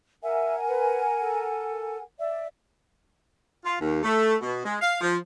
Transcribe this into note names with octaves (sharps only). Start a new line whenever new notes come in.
A#4 E5 F#5 G#5
B4
A4
D5 E5
F4
D#2
A3
B2
G#3
F5
F3